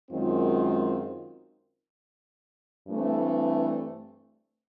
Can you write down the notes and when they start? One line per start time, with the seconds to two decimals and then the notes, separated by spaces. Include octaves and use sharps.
0.10 F#2 D#3 G#3 C4 F4
2.88 G2 E3 A3 C4